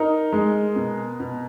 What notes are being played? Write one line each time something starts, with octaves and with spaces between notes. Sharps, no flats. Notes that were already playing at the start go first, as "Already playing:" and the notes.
Already playing: D#4 A#4
G#3
B2
B2